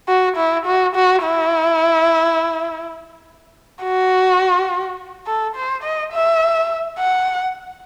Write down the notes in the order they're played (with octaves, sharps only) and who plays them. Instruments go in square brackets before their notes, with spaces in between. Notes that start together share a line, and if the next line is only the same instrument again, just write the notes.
[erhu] F#4
E4
F#4
F#4
E4
F#4
A4
C5
D#5
E5
F#5